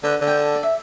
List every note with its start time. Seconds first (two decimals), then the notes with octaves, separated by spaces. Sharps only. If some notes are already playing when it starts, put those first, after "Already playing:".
0.03 D3 B4
0.21 D3
0.27 G5
0.38 A5
0.55 D5
0.63 E5